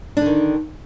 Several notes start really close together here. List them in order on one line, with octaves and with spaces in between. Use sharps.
D4 D3 D#3